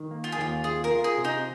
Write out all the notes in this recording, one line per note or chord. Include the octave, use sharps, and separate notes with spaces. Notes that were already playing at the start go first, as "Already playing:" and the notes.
Already playing: D#3
A#3
F4
G#4
D#2 F4
F4 G#4
A#4
F4
G#4
C3
D#4